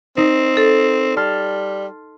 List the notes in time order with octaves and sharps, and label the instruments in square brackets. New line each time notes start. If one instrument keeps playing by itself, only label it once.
[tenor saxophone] C4 [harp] D#4
[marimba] A4
[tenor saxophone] G3 [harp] A5 C6 F6